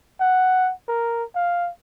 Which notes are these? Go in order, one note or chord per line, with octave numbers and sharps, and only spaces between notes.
F#5
A#4
F5